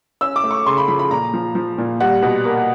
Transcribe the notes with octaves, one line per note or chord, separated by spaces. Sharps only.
C#4 E6
D6
A3
C#6
C#3 C6
B5
F3 B5
B5
A#2 A#5
F3
F3
A#2
G3 F#5
B2
A#3